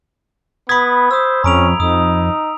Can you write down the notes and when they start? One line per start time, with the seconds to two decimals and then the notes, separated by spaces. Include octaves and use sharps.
0.69 B3 B5 D#6 G#6 B6
1.11 C5 D#6 E6
1.44 F2 C#4 A#5 D7 F7
1.80 F2 D#4 D#6